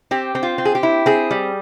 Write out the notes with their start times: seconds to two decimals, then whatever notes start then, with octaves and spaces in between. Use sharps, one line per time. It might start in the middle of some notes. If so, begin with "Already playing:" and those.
0.11 C4 G4
0.35 C4
0.43 F4
0.58 C4
0.65 G#4
0.75 G4
0.83 E4
1.06 C4 G#4
1.31 G3